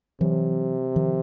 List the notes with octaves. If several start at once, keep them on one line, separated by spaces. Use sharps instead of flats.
C3 E3 F#3
D#3 F3